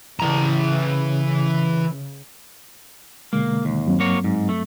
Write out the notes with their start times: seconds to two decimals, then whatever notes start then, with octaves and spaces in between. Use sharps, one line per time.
0.20 C#3 E3 A#5
3.33 B2 D3 G#3 A#3
3.65 D#2
3.85 G2 F#3 C4
4.00 A#3 F#4 C#5
4.24 G#2
4.49 A3